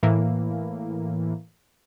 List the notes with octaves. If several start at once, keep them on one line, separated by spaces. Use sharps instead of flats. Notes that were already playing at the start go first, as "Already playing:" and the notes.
A2 E3 A#3